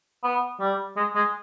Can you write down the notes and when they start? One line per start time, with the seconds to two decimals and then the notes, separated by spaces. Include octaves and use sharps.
0.23 B3
0.60 G3
0.97 G#3
1.15 G#3